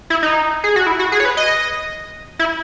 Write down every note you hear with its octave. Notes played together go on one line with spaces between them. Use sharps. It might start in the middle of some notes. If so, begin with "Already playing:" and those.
E4
D#4
G#4
F#4
E4
F#4
G#4
C#5
B4
D#5
E4